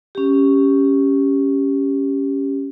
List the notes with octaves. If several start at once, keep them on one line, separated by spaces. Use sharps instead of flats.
C#4 G4